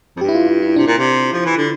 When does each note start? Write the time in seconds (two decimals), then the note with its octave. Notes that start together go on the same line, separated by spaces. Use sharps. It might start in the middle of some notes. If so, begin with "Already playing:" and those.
0.16 F2
0.21 G2 G4
0.29 E4
0.35 F4
0.48 F4
0.62 E4
0.76 C3 D4
0.87 A#2
0.97 C3
1.33 F3
1.45 E3
1.57 D3